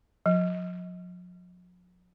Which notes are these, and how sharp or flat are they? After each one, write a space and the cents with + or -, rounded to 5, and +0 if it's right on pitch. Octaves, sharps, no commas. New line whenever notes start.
F3 +45